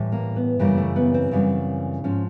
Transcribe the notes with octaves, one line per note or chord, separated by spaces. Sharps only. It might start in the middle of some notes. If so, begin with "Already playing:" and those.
Already playing: A2 E3 G3
A#3
B3
F#2 C#3 E3 G3 A#3
A3
B3
C4
F#2 C#3 E3 G3
G#2 F3 C#4